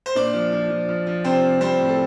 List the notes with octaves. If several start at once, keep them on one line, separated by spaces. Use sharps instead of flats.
C5
A#2 D4 D5
F3
F3
F3
F3
F3
C3 C4 C5
F3
G3 C4 C5
A2
A4